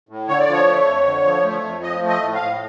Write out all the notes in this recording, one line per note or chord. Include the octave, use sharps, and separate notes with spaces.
A2
D3 C#5
D5
F3 C#5
A3
F2
D3
F3
A3
F2
F3 D#5
A3
D#5
A2
F5
A2